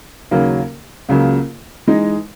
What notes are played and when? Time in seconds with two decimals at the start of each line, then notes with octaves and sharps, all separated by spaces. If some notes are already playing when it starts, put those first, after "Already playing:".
0.31 D#2 C#3 F#3 A#3 C#4
1.09 C#2 C#3 F#3 A#3
1.87 E3 G#3 D#4